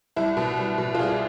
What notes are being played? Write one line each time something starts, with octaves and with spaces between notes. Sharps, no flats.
C2 E4
B2
C2
B2
F4
C2 G#4